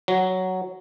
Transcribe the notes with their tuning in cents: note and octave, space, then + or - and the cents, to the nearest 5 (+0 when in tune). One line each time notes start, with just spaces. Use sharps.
F#3 +5